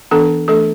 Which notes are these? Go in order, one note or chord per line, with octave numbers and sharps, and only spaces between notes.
E3 B3 D4 A4
E3 A3 D4 A4